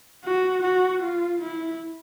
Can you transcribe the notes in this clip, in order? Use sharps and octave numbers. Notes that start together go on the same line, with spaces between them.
F#4
F#4
F4
E4